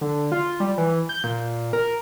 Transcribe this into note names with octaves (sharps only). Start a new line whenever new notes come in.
D3
F4
G3
E3
G6
A#2
A#4